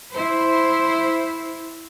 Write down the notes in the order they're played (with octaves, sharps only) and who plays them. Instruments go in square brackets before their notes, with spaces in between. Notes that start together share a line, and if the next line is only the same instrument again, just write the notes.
[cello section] E4 C5